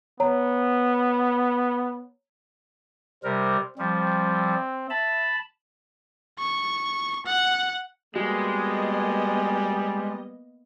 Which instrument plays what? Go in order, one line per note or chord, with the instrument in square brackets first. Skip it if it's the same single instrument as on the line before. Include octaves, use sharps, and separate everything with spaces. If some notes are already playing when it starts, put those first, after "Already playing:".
[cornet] B3 [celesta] C#5 A#5
[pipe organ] C3 G3 A#4 [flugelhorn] C5
[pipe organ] F3 G3 [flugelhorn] C4
[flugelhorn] E5 [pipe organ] A5 B5
[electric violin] C#6
F#5
[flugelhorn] G3 [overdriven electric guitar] G#3 [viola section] A#3 B3 D#5 [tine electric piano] F#4